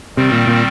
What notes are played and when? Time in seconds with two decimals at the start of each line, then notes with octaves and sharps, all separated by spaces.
0.17 C3 D#3 G3 C4
0.32 A#2
0.47 A#2